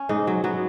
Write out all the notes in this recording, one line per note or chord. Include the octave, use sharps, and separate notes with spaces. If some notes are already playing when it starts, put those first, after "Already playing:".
Already playing: C#4
G#2 D#4
F#3
F#3 B3